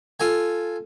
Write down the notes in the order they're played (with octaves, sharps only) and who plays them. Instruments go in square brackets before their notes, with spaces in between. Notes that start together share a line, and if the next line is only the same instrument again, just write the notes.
[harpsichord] F4 A4 G#5